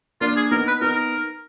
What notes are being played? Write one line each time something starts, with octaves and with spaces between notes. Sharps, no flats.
A#3 D4 F4
G#4
B3 D#4 A#4
B4
B3 D#4 A#4